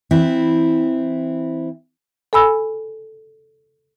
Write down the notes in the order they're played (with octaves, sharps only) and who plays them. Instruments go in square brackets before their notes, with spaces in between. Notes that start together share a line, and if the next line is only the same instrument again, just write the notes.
[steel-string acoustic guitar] E3 C4 E4
[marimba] A4 G#5 B5 E6